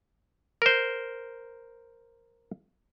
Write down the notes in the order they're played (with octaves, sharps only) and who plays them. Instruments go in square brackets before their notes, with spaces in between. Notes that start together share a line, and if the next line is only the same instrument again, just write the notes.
[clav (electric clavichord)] A#4 C5